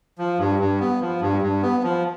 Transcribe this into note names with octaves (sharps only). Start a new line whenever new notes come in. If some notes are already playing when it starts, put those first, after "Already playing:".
F3
G2
G2
B3
F3
G2
G2
B3
F3